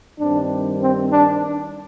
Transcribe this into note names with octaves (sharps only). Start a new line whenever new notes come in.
G2 D#3 G3 C4 D4
C4
D4